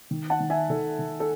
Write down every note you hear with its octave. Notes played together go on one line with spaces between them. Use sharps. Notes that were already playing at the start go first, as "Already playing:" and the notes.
D#3
F#5 A5
D#3
E5 G#5
D#3 A4
D#3
A4